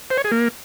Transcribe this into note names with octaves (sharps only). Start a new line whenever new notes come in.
C5
C#5
G#4
A#3